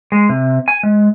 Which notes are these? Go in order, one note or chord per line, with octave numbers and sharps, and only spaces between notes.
G#3
C3
G#5
G#3